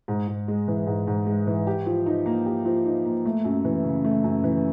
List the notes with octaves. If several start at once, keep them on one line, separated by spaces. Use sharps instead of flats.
G#2
G#2
G#3
E3
G#2
G#2
G#3
E3
G4
F3
D#4
A#3
G4
F3
D#4
A#3
A3
F#2
E3
C#3
A3
F#2
E3